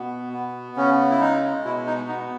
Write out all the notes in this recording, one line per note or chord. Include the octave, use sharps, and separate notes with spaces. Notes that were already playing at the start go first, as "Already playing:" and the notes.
Already playing: B2 B3
B3
C#3 C#4
E4
G#3 D#4
B2 E4
D#4
B3 D#4